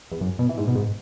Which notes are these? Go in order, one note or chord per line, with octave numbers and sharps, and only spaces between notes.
E2
F#2
B2
E3
G#2
B2
G#2